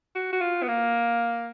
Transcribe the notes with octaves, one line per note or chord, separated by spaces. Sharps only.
F#4
F#4
F4
B3
A#3